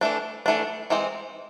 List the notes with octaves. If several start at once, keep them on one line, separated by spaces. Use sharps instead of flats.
E3 A3 D4
E3 A3 D4
E3 G#3 C4